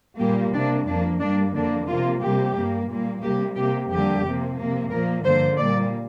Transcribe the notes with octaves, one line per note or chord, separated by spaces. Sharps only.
A#2 G3 A#3 G4
C3 A#3 D4
F2 F3 A#3 D4
G2 G3 A#3 D4
F2 D3 A#3 D4
C3 F3 A#3 F4
C3 G3 A#3 G4
G2 G3 A#3
A#2 G3 A#3
C3 G3 A#3 G4
C3 A#3 G4
F2 D3 G3 A#3 G4
C3 F3 A#3
C3 A#3
A#2 F3 A#3 A#4
G2 D3 F3 A#3 C5
A#2 G3 A#3 D5